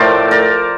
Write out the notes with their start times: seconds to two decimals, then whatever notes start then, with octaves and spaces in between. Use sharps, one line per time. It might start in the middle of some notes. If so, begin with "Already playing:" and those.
Already playing: A2 F3 A3 A#4 C5 D5
0.31 A#4 D5